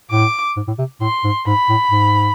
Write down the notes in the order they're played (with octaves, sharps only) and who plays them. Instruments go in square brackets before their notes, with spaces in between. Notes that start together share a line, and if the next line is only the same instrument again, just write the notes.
[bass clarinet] A2 [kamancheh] D6
[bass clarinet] G#2
A2
C3
[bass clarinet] A2 [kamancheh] C6
[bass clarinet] G#2
[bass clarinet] G#2 [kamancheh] B5
[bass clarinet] A2
G#2